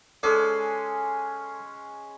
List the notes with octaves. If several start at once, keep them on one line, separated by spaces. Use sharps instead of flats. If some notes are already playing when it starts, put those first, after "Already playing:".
G#3 C#4 G#4 A4 D5